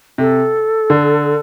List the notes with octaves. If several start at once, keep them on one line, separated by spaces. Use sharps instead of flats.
C3 A4
D3